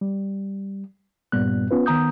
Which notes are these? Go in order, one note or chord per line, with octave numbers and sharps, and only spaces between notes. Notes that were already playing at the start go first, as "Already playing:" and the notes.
G3
G2 A#2 G3 B3 F#6
B3 C#4 F4 B4
D#3 B3 A#5 D#6 G6